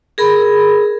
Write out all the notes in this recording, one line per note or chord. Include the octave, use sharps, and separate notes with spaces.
G#4 A#4 B5